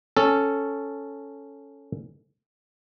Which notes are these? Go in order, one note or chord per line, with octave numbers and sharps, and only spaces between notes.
C#4 A4